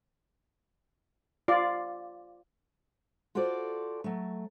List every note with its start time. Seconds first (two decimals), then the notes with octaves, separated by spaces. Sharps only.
1.48 F4 D5
3.35 F4 F#4 A4 C5 D5
4.04 F#3 A3